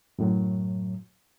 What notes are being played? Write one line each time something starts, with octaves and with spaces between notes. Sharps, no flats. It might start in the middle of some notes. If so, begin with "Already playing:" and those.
F#2 A2 F#3